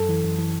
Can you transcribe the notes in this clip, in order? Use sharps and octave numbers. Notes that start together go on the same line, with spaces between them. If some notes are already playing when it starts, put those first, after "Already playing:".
Already playing: F#2 A4
E3
F#2
E3